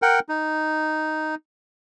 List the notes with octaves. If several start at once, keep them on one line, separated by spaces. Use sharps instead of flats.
A#4 F#5 G5
D#4